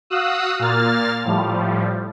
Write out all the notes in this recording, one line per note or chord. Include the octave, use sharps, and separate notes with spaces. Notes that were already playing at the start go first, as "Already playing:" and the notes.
F#4 F5 D#6 E6 F#6
A#2 A#3 F6 A6
A2 F3 G3